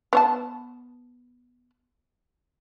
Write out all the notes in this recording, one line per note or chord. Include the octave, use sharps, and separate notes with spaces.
B3 C#5 A5